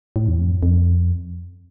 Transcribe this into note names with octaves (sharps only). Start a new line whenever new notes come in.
A2
E2
F2
F2